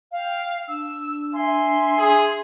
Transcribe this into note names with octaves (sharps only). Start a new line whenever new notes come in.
F5 G5
D4 E6
E5 G#5 C6
G#4